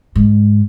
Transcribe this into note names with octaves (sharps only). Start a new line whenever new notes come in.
G#2